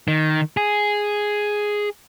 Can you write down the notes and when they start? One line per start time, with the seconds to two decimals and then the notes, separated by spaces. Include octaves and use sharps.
0.08 D#3
0.57 G#4